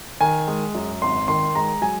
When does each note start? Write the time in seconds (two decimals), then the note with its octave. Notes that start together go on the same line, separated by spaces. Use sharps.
0.21 D#3 G#5
0.48 G#3
0.75 F#2
1.02 G#1 C6
1.28 D#3 C6
1.55 G#3 A#5
1.82 F#3 G#5